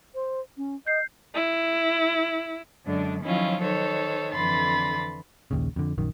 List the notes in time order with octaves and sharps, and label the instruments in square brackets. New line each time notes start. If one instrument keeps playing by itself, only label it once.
[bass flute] C5
C#4
[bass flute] D#5 [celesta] G6 C7
[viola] E4
[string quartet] F#2 D3 G#3 D4
D#3 F3 F#3 C#4 E4 F4
D#3 A4 C5 C#5
F2 D3 E3 B5 C6 A6
[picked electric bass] A#1 D#2 C#3
F2 D3
A#1 F#2 D#3